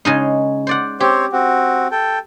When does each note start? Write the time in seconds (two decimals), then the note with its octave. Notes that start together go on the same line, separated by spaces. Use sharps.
0.05 C#3 G#3 D#4
0.67 C5 D5 F#5
1.00 C4 G4 C5 C#5
1.33 C4 F#4
1.91 A4 G5